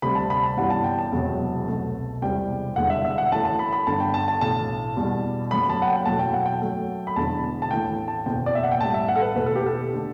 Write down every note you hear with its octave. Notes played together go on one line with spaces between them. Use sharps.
D2 C3 G3 B5
A5
B5
A5
G1 F#2 E3 G3 F#5
A5
G5
A5
E1 E2 C3 F#3
C2 B2 A3
E1 E2 C3 G3 G5
E1 E2 D3 G3 F#5
E5
E5
F#5
F#2 E3 A3 A5
A5
B5
B5
G1 G2 D3 A5
G5
A5
A5
B1 A2 E3 A5
E2 B2 G3
F#1 F#2 F#3 A3 B5
A5
F#5
G5
E2 B2 F#3 A3 A5
G5
F#5
G5
F#2 F#3 A3
B5
E1 E2 D3 A5
A5
A1 A2 E3 A3 G5
A5
F#1 E2 B2 G5
D5
E5
F#5
G5
A1 A2 G3 A5
E5
F#5
A4
B4
E2 B2 A3 B4
A4
G4
A4
D3 A3